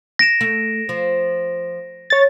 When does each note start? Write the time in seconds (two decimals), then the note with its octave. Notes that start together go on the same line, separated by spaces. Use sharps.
0.19 A#6 D7 E7
0.41 A3
0.89 F3
2.10 C#5 A6